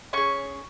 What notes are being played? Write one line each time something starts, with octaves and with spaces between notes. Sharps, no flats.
C#4 G#4 C#6